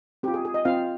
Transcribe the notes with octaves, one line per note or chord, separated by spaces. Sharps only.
C4 F4 G4
G#4
G#4
D#5
C4 F4 F5